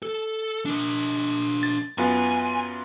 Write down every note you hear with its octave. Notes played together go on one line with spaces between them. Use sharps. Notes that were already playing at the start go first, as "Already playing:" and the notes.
A4
D4 A#4
A6
F#2 B3 F4 G#5